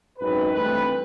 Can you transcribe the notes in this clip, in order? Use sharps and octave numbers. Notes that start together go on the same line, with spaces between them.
G#1 F#2 D#3 B4
G2 E3 A3 C4 B4